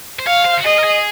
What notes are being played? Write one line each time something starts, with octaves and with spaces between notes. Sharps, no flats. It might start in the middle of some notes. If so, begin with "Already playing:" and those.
C5
C#5 F5
C5
F#4
G#4 D#5
A#4
G#4